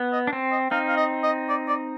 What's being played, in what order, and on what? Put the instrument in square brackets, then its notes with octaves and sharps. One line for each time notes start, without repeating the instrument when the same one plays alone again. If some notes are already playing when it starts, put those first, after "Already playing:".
Already playing: [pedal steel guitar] B3
[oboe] D#5
[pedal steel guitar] D4
C4
[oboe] D#5
[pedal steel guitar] C4 D#4 [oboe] F5
[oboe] F5
D#5
D#5
D5
D5